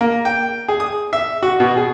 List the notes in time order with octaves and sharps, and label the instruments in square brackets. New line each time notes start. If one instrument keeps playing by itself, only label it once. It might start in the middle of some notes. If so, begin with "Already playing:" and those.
[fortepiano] A#3
G5
G#4
D#6
E5
F#4
B2
G#4